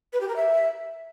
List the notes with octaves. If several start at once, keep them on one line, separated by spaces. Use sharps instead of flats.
B4
G4
A#4
E5